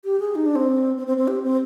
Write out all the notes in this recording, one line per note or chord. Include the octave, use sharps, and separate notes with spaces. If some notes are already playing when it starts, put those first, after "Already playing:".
G4
G#4
D#4
D4
C4
C4
C4
C4
G4
C4